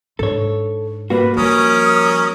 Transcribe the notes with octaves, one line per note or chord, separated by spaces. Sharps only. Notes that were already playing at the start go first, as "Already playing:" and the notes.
G#2 D4 A4 C#5
G3 A#3 F#4 B4
F3 C#4 A#4 D#6